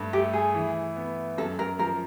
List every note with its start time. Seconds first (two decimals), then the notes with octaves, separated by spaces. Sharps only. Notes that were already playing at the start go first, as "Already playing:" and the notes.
Already playing: G2 A3
0.13 A3 G4
0.33 G#4
0.55 E3
0.96 B3
1.37 F#2 A4
1.59 A#4
1.79 F3 A#4